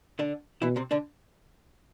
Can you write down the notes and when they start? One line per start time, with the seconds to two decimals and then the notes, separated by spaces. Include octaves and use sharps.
0.19 D3 D4
0.62 B2 E3 E4
0.76 C3 C4
0.91 D3 D4